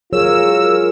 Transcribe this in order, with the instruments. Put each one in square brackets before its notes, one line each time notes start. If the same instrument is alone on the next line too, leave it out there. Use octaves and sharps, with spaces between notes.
[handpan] F#3 G#4 C#5 [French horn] F4 [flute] A#4 [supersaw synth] E6